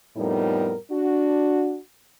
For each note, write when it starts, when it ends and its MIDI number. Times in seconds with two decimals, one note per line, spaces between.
0.17 0.74 41
0.17 0.74 45
0.17 0.74 55
0.17 0.74 59
0.17 0.74 63
0.17 0.74 70
0.91 1.78 62
0.91 1.78 66